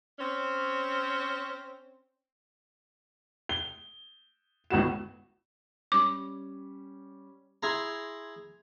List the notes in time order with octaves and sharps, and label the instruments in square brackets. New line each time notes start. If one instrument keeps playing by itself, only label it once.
[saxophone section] C4 C#4
[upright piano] G7
G#1 C#2 A2 B3 F#4 E7
[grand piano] G3 C#4 [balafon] D6
[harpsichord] E4 G#4 A#5 [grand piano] C6 G#6 F7